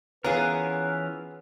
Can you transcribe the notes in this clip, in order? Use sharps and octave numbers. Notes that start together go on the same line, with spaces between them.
E3 B3 C#4 F4 G#4 A#4 B4